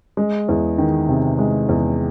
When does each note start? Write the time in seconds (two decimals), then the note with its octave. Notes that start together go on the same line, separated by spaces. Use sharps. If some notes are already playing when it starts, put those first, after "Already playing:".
0.17 G#3
0.49 E2
0.78 D#3
1.09 C3
1.39 G#3
1.69 E2